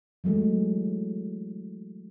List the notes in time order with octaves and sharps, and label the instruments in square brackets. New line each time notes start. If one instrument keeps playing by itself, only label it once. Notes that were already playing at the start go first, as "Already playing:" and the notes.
[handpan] E3 F#3 G#3 A3